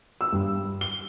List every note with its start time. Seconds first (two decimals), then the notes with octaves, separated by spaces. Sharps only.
0.21 E6
0.33 G2
0.81 G7